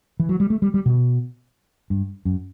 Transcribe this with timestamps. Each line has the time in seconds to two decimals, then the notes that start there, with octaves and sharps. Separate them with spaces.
0.20 E3
0.29 F#3
0.40 G3
0.50 A3
0.62 G3
0.74 G3
0.86 B2
1.90 G2
2.25 F#2